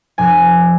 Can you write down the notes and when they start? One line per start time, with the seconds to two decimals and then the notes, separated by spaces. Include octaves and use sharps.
0.18 F1 G#5